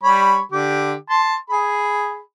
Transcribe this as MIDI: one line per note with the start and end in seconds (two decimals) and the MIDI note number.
0.03 0.40 55
0.03 0.40 73
0.03 0.40 83
0.52 0.94 50
0.52 0.94 67
1.10 1.35 81
1.10 1.35 84
1.50 2.20 68
1.50 2.20 83